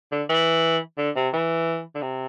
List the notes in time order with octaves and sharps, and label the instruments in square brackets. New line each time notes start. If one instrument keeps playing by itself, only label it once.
[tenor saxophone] D3
E3
D3
C3
E3
D3
C3